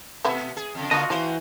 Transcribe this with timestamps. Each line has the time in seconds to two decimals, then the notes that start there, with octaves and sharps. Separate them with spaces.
0.25 B2 A3 B3 E4 E5
0.57 G#4
0.75 F2 C#3
0.91 C#3 A#3 F4 F#4 A4 D#5
1.10 E3 F3 A#3 F#4 C5